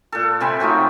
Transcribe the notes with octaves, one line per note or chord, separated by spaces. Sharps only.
A#2 A4
C3 C4 G#5 B5
F#3 A3 D#4 F4